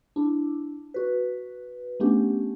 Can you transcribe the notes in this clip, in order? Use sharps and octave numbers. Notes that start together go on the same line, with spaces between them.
D4 E4
F#4 B4
A3 B3 C#4 D4 G4